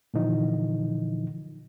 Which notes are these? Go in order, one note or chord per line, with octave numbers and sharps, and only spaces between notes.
A#2 D3 E3 F3 D#4